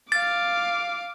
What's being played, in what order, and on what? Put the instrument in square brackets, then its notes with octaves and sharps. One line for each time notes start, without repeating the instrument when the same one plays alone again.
[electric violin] F5 D6 [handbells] A6